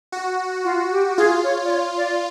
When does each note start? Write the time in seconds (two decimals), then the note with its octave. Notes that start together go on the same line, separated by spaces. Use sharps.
0.12 F#4
0.64 F4
0.91 G4
1.17 F4 G#4
1.44 C#5
1.64 D5
1.70 C#5
1.97 D5